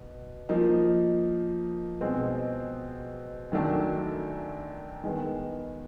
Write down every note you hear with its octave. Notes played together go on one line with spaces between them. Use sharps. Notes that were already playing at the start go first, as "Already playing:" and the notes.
Already playing: B2
F3 A#3 D#4
B2 G#3 C4 D#4
F#2 D#3 F#3 A3 D4
D#3 G#3 B3